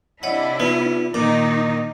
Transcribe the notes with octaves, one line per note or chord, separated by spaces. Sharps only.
C3 D4 E4 C#5 D#5 F#5
B3 D#4 F4
A#2 D#3 D#4 D6